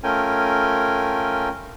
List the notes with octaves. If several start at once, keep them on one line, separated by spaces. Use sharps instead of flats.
A3 C#4 F4 A#4 G5 G#5